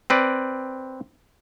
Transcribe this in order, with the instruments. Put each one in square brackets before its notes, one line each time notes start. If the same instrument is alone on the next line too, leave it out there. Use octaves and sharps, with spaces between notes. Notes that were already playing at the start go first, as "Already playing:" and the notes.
[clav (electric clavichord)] C4 B4 D5